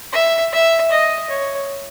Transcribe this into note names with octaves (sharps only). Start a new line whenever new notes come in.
E5
E5
D#5
C#5